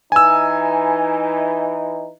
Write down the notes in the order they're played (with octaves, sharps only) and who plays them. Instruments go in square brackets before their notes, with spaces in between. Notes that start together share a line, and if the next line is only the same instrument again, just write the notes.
[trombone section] E3 D#4 [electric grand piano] G#5 E6